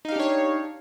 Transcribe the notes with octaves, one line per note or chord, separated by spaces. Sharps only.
D4 D#4 G4 C#5 F5